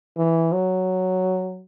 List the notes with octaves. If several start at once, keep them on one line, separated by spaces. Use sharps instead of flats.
E3
F#3